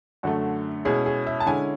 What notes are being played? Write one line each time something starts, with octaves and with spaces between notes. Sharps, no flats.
F#2 D3 A3 F#4
B2 G#3 C#4 E4 G#4
G#4
E5
A5
D3 G#3 C#4 E4 G#5